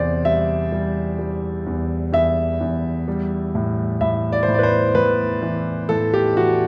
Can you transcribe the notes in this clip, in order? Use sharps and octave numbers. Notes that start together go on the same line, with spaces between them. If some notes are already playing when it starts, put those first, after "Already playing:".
Already playing: E2 C3 C5 D5
G3 E5
G3
G3
E2
E2 E5
E2
G3
A2
A2 E5
D5
C5
A2
B4 D5
C5
A2 B4
E3
A2 A4
G4
E3 F#4